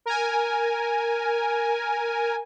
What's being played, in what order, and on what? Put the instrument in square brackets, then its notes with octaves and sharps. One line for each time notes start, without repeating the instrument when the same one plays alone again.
[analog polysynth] A#4 G#5